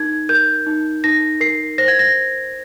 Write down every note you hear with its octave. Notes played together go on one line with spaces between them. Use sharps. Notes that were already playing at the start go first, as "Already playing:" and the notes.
Already playing: D#4 A#4 G#6
A#4 G6
D#4
D#4 A#6
A#4 C7
C5 A#6
G#6
A#6